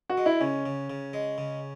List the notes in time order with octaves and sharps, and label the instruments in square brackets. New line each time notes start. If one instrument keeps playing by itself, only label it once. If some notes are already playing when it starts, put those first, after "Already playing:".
[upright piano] F#4
[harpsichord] G#3
[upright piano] E4
[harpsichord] C#3 [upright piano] C#4
[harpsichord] C#3
C#3
G#3
C#3